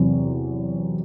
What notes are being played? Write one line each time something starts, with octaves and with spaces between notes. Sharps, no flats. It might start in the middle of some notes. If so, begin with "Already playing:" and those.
Already playing: E2 C3 F#3 C4